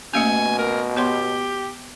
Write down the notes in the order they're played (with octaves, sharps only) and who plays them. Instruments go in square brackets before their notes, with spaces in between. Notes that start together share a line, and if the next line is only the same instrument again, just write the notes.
[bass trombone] B2 [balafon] A3 A#3 C#4 [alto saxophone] G#5
[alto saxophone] A#4
[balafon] B3 C#5 C6 [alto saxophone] G4